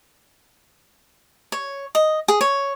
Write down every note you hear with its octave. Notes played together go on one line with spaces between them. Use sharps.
C#5
D#5
G#4
C#5